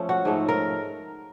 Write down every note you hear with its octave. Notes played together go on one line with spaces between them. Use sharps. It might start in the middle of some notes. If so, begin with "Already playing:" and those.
Already playing: F3 A3 C#4
F#4
G#2 F3 A3 C#4
A#4